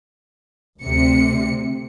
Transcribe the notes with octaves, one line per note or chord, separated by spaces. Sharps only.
D2 C3 C#7